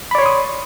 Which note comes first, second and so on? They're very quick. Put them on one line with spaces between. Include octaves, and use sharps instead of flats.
B5 D5 C#5 C6 D#6